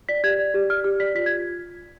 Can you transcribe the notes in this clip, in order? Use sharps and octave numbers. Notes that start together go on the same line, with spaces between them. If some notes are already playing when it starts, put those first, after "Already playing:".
D5 B6
G4 G#6
D5
G4
D5 F6
G4 F6
D5 B6
F4 B6
G#6